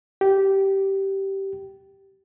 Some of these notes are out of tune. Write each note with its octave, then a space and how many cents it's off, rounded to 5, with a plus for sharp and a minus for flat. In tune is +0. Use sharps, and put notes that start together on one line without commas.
G4 -15